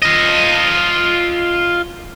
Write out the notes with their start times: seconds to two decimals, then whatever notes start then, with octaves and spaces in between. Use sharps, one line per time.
0.02 F4 D#5